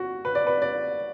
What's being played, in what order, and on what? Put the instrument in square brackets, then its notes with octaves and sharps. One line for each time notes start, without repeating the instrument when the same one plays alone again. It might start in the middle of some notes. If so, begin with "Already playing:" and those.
Already playing: [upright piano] F#4
B4
D5
B4
D5